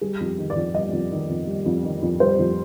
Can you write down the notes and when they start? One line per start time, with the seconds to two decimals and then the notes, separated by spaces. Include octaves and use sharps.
0.01 G3 G#4
0.20 F2
0.26 G4
0.38 D#3
0.50 D5
0.56 F2
0.74 G3 D#5
0.92 F2
1.12 D#3
1.29 F2
1.47 G3
1.65 F2
1.84 D#3
2.02 F2
2.20 G3 C5
2.39 F2